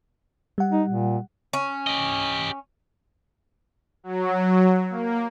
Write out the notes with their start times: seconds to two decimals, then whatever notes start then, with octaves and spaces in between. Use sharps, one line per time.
0.58 G3 F#5
0.72 D#4
0.88 A#2
1.53 C#4
1.87 G4 D#5
4.04 F#3
4.90 A#3